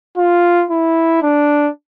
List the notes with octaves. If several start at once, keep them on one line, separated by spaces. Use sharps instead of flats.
F4
E4
D4